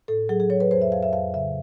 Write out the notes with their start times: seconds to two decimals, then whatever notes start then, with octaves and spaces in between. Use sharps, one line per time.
0.08 A2 A4
0.29 F#3 G#4
0.40 G#4
0.50 F#3 C#5
0.60 B4
0.71 F2 C5
0.82 E5
0.92 F2 F5
1.03 E5
1.13 F2 F5
1.34 C#3 E5